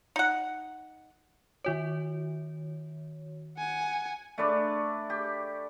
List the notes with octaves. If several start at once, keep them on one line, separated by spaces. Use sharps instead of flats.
D#4 F#5
D#3 F#4 C#5
F#5 G#5
A3 D4 B4 D5
G4